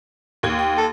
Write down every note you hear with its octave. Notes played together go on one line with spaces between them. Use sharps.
D#2 G#6
G5
A4